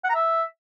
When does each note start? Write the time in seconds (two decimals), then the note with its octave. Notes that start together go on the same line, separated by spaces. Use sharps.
0.04 F#5
0.09 A#5
0.15 E5